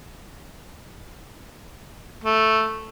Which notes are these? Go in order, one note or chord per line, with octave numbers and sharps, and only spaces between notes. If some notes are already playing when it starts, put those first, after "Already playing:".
A3